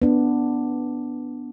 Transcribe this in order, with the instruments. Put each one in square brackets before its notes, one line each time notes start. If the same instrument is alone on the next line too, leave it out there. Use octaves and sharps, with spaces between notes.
[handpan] B3 D4